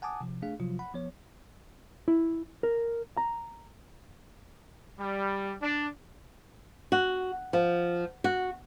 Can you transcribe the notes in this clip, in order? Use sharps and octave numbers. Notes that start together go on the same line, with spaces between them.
F#5 G#5 A5 D6 D#6
C3 F3
A3 D4 G#4 F5
C3 F3 F#3 F4
F#5 B5
F3 B3 C#5
E4
A#4
A#5
G3
D4
F#4
F3
F#4